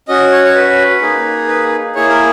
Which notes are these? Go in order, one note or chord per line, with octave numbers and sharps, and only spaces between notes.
C#4 F#4 D#5
C#5
C#5
B4
A#3 D#4 G#4
B4
A#3 E4 G#4 C#5
A#4